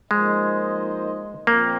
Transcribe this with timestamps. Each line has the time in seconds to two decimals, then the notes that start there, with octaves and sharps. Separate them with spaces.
0.11 F3 G#3 A#3 D#4 C5 D#5
1.47 A#2 F3 A#3 C4